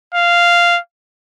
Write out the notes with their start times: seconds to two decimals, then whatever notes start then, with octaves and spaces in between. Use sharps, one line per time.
0.15 F5